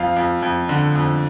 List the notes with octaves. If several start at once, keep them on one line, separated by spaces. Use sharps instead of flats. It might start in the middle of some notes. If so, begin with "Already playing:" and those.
Already playing: F2 F5
F2
F2
D3
F2